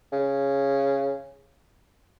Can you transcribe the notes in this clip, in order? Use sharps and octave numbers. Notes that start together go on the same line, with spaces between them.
C#3